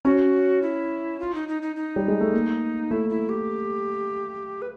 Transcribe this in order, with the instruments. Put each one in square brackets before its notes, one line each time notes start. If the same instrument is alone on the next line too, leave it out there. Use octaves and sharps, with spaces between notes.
[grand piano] C#4 [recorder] F#4
[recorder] E4
F4
D#4
D#4
D#4
D#4
[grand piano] G3
G#3
A3
A#3
[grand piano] A3 [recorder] E4
[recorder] E4
G4
B4